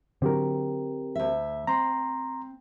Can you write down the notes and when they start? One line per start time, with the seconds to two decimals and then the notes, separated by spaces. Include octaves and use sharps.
0.22 D3 F#3 C4 G4 A#4
1.15 D2 E5
1.67 C4 A#5 C6